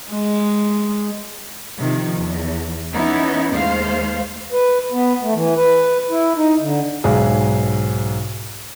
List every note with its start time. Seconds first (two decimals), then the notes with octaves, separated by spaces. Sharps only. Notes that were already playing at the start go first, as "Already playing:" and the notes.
0.11 G#3
1.77 C3 D#3 F3
2.16 E2
2.92 E3 B3 C#4 D#4 E4
3.52 D#2 G#3 A3 C5 F5
4.52 B4
4.92 B3
5.22 A3
5.34 E3
5.56 B4
6.10 E4
6.36 D#4
6.60 D3
7.04 B1 G#2 G#4